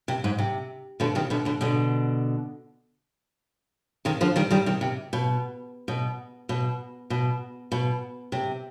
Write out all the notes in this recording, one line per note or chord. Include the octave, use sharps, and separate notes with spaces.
C3
G#2
C3
B2 D3
C3 D#3
B2 D3
B2 D3
B2 D3
C3 D#3
D3 F3
D#3 G3
D#3 G3
C3 D#3
C3
B2
B2
B2
B2
B2
C3